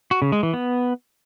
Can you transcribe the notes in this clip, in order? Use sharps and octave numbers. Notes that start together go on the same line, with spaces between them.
F#4
C#3
G#3
E3
B3